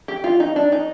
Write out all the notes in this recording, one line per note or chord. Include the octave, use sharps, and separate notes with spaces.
G4
F4
D#4
D4
D#4